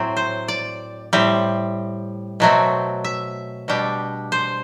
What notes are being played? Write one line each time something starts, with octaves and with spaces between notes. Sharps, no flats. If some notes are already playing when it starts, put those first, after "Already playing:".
Already playing: A2 F#3 C4
C5
D5
A2 G3 C4
B2 F#3 A3 C4
E5
B2 G3 D4
C5